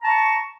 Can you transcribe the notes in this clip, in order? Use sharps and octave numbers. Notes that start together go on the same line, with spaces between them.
A5 A#5 C#6